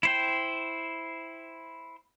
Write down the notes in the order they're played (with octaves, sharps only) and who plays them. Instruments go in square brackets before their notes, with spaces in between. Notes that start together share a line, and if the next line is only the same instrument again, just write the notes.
[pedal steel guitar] E4 C5 G5